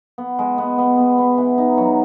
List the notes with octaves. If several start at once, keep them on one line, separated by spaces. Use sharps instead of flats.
B3
G#3
B3
B3
B3
B3
E3
D#4
F#3